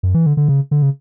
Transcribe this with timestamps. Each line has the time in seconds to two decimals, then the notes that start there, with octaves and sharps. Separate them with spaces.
0.03 F#2
0.15 E3
0.26 D3
0.37 D3
0.48 C#3
0.71 D3
0.82 C#3